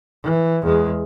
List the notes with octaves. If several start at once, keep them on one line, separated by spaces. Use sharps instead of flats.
E3
E2 G#3